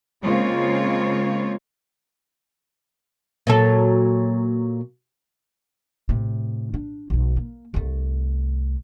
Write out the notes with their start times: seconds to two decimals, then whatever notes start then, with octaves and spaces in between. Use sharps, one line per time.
0.23 C#3 G#3 A#3 C4 F4 C#5
3.47 A#2 F#3 A4
6.09 A2 C3
6.74 D4
7.10 B1 G#3
7.37 A#3
7.74 C2 A3